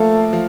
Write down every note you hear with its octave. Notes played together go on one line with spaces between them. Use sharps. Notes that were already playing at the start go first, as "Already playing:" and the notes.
Already playing: F3 A3 A#3 F4 A4
F3